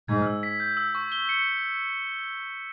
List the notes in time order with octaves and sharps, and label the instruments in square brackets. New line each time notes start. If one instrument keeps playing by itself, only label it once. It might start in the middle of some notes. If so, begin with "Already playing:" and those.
[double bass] G#2 [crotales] G#6
[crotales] E6
B6
G6
E6
C#6
G7
C#7